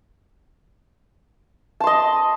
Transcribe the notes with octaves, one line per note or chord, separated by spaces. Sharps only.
D#5 A5 C6